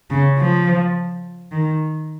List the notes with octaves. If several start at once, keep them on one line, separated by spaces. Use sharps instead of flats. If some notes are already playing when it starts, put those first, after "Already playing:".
C#3
F3
D#3